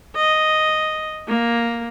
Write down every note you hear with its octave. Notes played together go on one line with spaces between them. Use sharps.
D#5
A#3